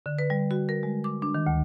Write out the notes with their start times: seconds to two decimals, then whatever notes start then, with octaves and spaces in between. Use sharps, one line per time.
0.06 D3
0.19 B4
0.30 G3
0.51 F#4
0.69 A#4
0.83 G#3
1.04 D6
1.22 D4
1.34 D#3
1.47 D2